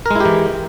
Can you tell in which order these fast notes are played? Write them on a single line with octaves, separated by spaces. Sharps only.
A#4 G#3 E4 G4 E3